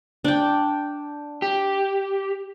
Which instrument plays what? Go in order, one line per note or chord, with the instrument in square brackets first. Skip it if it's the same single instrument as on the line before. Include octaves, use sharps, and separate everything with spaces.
[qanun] D4 G5
[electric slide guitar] G4